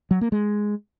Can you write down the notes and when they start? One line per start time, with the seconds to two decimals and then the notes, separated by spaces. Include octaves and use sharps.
0.11 F#3
0.21 A#3
0.32 G#3